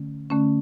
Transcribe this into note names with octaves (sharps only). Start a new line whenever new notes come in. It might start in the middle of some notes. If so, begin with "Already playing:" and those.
Already playing: D3 A3 C#4
D3 A3 C#4